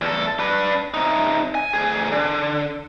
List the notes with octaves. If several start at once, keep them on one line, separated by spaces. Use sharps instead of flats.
E2 A4
D4 B4
C3 D#4
G#5
D2 G#4
D3